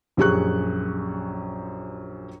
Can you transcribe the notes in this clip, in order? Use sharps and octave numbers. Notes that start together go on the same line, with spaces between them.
A#1 F#2 G4 G#4 C#6 F#6